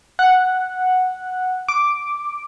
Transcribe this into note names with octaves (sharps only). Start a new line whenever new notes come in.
F#5
D6